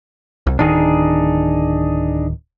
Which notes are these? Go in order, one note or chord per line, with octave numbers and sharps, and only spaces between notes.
C2
D1 D#3 D4 D#4 G#4